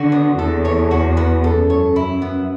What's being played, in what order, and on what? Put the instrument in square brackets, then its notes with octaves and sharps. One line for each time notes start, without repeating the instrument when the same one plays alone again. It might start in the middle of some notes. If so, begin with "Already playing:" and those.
Already playing: [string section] D3 [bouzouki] F#4
[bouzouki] B3
[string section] E2 [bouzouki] A4
[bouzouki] C#5
F#4
B3
[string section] F#2 [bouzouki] A4
[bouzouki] C#5
E4
B3